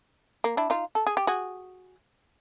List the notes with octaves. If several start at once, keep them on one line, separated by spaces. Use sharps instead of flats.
A#3
D4 E4
D#4 F4
A4
G#4
G4
F#4 G#4